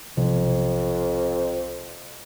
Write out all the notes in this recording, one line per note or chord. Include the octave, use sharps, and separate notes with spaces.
B1 F2 C3 F3